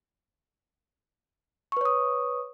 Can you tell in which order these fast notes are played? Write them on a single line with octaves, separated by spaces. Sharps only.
C#6 B4 C#5 D#6